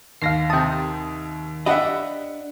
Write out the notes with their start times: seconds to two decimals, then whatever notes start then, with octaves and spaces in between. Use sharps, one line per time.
0.22 D#2 F5 A#6 C7
0.50 C3 G5 A5 D#6
1.66 D4 G4 D#5 E5 F#5 B5